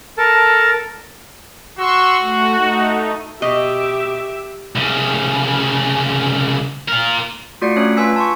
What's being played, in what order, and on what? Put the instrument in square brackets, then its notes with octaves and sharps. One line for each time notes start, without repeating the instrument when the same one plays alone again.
[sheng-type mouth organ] A4 A#4 A5
[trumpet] F#4 [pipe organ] C6 C#6 E6
[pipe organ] A3
A3 D#4
[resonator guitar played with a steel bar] B2 D#5 [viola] G4 E5
[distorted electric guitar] C2 C#3
F4 A#4
[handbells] A3 F4 F#4 D5 C7 C#7
A3 C#4 D4 C#5
F4 B4 G#5 E6 B6
A5 C6 C#6